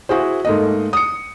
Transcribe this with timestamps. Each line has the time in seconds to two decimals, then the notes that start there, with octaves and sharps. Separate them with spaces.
0.09 E4 F#4 G#4 C5
0.45 G#2 A3 A#3 D#5
0.93 D#6 C#7